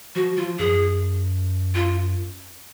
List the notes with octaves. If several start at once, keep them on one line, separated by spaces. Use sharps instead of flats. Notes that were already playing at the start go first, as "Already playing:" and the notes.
F3 F#4
F3 F4
F#2 G#4
F4